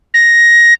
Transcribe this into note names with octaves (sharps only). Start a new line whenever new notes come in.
A#6